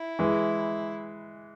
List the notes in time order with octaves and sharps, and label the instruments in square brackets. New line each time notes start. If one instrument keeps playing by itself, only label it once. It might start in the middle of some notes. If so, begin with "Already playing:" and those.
Already playing: [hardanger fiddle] E4
[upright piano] E3 G#3